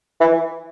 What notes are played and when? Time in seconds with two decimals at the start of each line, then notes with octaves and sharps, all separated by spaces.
0.21 E3